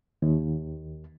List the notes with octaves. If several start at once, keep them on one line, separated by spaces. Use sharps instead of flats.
D#2